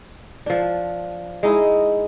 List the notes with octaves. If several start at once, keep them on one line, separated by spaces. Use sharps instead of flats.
F3 D4
G#3 D#4 E4